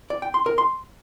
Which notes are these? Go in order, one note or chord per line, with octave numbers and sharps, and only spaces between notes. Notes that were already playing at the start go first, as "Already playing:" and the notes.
D5
G5
C6
A#4
C6